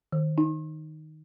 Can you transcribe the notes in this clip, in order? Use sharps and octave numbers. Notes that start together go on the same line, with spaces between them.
D#3
D#4